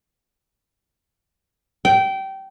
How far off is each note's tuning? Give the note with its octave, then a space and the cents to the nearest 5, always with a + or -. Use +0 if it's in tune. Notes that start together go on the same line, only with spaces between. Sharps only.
G5 -20